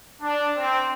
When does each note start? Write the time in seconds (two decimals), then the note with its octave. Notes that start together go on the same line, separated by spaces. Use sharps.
0.22 D4
0.56 C4